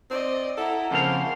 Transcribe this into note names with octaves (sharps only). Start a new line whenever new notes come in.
C4 D5 D#5
E4 A4 F#5 A#5
F2 C#3 A#3 C5 F5 A5